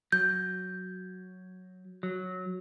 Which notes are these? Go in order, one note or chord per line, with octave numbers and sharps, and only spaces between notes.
F#3 G6
F#3